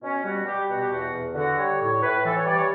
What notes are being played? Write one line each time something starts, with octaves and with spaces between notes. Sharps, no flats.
B2 C#4
G3 F#4
G3 G4
B2 F#4
G4
E2 F#4
E2
D3 F#4
G3 C#5
A2 C#5
A2 B4
E3 A4
C#5
G3 D5
C#5